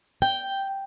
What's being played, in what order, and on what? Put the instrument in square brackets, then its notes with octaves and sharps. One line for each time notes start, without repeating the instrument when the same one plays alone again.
[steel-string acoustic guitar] G5